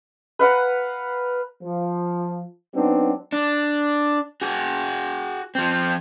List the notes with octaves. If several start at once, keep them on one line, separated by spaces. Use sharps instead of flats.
B4 F5 F#5 A#5
F3
F#3 B3 C4 D4 D#4
D4
F#4 G#4
F3 C4